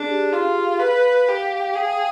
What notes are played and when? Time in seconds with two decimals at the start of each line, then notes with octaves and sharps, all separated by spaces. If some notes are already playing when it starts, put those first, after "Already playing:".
Already playing: D4 G#4
0.09 G4
0.32 F4 F5
0.80 B4
1.28 G4 F5
1.44 F5
1.60 G5
1.73 G#4 F5
1.86 G5